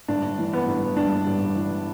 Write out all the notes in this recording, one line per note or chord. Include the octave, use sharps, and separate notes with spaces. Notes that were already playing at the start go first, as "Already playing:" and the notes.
G1 D4
E3
B3
G1
G2 D4
G1
E3